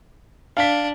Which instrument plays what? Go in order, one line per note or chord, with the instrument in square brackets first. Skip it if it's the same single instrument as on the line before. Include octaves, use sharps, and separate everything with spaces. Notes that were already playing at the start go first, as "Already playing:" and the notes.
[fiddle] D4 [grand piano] F5 B6